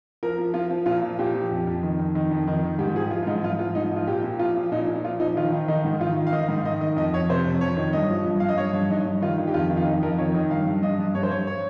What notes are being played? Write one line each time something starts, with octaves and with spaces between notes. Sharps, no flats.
F3 A#4
F3
F3 F4
F3
A#2 F4
F3
A#2 G4
F3
F2
F2
D#3
F2
D#3
F2
D#3
D#3
G#2 G4
F3 G#4
F3 F4
F4
G#2 D#4
G#2 F4
F3 F4
G#2 D#4
F3 F4
A#2 G4
A#2
F3 F4
F3
A#2 D#4
A#2
F3 F4
F3 D#4
D#3 F4
D#3
D#3 D#4
G#2
D#3 F4
D#3
F5
D#3 D#5
G#2
D#3 D#5
D#3 D#5
F2 D#5
F2 C#5
C3 C5
F2
F2 C#5
D#3
G2 D#5
F3
G2
G2 F5
D#5
G2 C#5
G2
G2 D#4
G2
D#3 F4
D#3
G4
F2 F4
D#3
F4
F2 D#4
F2 A#4
D#3 C#5
D#3 D#5
G2 F5
G2
G2 D#5
G2
G2 C#5
C5
G2 C#5
C#5